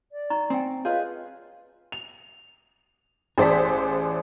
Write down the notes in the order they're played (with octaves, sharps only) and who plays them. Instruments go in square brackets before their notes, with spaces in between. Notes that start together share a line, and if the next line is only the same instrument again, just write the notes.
[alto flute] D5
[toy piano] D#4 A#5 C#6
[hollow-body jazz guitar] C4 [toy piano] G5 G#5
[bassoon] F4 [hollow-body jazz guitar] G#4 D#5 [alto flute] B4 [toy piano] C#5
[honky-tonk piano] F7
A1 G#4 C5 D5 A5 B6